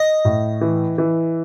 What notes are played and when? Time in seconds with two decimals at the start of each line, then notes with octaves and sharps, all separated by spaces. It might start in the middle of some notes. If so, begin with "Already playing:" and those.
Already playing: D#5
0.25 A2
0.61 E3
0.98 E3